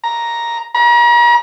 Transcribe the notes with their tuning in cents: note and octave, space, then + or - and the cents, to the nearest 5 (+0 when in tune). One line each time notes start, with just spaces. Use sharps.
A#5 +5
A#5 +40